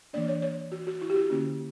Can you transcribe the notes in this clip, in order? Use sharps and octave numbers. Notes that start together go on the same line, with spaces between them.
E3 A#3 D4 D5
C#5
C#5
F#4
F#4
E4
G4
F#4
D3 A#3 C#4